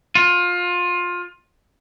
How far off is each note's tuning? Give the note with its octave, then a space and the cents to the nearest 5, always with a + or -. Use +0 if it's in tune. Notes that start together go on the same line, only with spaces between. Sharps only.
F4 +20